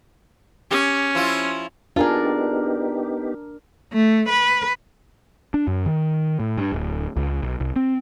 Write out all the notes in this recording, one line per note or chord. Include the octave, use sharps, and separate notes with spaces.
C#4 G4
F3 E4 F4
B3 D4 D#4 F4 G4 G#4 A#4
A3
B4
D4
F#2
D#3
A2
G2
D1
C#2
B1
C2
C4